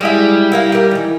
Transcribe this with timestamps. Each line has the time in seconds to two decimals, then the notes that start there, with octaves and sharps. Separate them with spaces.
0.01 G3 G#3 E4 E5
0.52 E4 A#4 F5
0.72 G4 A#4
0.91 D#3 E3